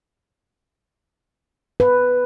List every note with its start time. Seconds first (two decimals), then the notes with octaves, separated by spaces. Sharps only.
1.80 B4